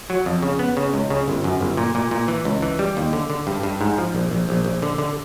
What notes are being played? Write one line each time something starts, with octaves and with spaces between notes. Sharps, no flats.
F#3
F2
C#3
B3
C#3
C#2
C#3
G1
F#2
G1
A#2
A#2
A#2
E3
C#2
E3
G3
D#2
D3
D3
G2
G2
G#2
F3
A#1
A#1
A#1
A#1
D3
D3